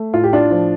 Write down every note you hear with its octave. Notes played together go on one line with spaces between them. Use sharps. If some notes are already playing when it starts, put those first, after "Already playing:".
Already playing: A3
A2 F4
G4
D4 F4
F3